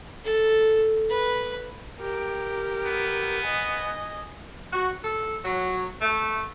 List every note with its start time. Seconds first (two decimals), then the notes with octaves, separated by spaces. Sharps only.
0.24 A4
1.09 B4
1.99 G4 A#4
2.86 B3
3.44 D#5 G#5
4.73 F#4
5.02 A4
5.44 F#3
6.01 A3